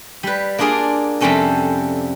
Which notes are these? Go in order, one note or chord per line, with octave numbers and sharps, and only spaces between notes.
G3 B4
A#3 D4 F4 G#4 D5
F2 C3 G3 C4 C#4 A4